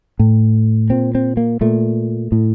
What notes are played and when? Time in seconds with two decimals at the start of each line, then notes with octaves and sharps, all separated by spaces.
0.19 A2
0.90 A#2 C4
1.15 C4
1.37 A#3
1.61 A#2 A3
2.32 A2